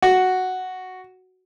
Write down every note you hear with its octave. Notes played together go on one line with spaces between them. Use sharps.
F#4